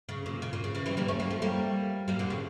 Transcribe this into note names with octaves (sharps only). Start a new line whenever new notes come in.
C#3
A#2
C#3
A#2
C#3
C#3 E3
E3 G3
G3 A#3
A3 C#4
G3 A#3
F3 A3
G3 A#3
G3 A#3
A#2 D3
C#3